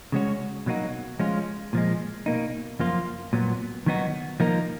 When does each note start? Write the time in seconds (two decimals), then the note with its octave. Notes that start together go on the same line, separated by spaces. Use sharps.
0.12 C#3 G#3 C#4 F#4 C#5
0.66 B2 F#3 A#3 D#4 F#4
1.19 F3 G#3 C#4 F4
1.73 A#2 F3 G#3
2.26 B2 A#3 D#4
2.80 F#2 F3 A#3 F4
3.33 A#2 F#3 B3
3.86 D#3 F#3 B3 D#4 F#4
4.40 F3 A#3 D#4 A#4